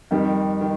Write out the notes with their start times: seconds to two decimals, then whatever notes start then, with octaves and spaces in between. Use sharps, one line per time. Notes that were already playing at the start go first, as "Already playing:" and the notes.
0.11 F2 D#3 G3
0.61 D#3